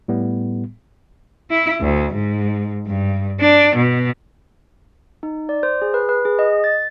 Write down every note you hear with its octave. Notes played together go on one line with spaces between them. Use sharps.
A2 G3 B3
E4
D2
G#2
G2
D4
B2
D#4
D5
C5
G#4
B4
B4
G#4
D#5
A6